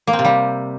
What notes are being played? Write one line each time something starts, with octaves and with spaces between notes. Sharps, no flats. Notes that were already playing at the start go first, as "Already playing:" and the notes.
A#3
C4
C3
G3